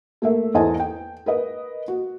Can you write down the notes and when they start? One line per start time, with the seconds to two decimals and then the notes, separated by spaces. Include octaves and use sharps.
0.22 A3 A#3 E5
0.54 E2 A4 C5 D#5 G#5 A5
0.80 G5
1.26 A#4 B4 D#5
1.88 F#4